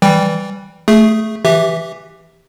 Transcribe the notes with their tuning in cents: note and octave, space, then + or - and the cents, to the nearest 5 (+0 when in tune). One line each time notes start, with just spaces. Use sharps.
E3 +0 G3 +0 G5 +10
A3 +0 G#4 +10
E3 +0 G4 +0 E5 +0